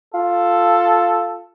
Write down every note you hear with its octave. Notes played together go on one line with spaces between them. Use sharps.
F4 A4